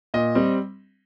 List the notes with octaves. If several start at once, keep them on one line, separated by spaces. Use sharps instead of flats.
A#2 D#5
G3 C4